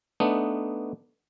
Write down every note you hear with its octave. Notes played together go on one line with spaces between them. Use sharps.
A3 B3 D4 D#4